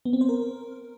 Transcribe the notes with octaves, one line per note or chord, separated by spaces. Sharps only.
B3
C4
C5
A#4